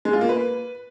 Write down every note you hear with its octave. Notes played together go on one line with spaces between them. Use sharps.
G#3
F4
A#3
B4